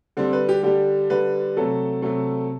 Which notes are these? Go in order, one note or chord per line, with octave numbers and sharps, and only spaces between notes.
D3 G3 C4
B4
G4
D3 G3 G4
D3 G3 B4
C3 F#3 A3 A4
C3 F#3 A3